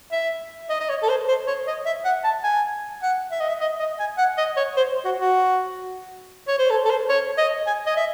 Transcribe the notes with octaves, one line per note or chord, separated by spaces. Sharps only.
E5
D#5
D#5
C#5
A4
C5
C5
C#5
D#5
E5
F#5
A5
G#5
F#5
E5
D#5
E5
D#5
D#5
G#5
F#5
D#5
C#5
C5
F#4
F#4
C#5
C5
A4
A4
C5
C#5
D#5
G#5
D#5
E5